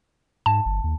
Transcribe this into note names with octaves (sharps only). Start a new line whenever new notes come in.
G#2 A5
G1
D#2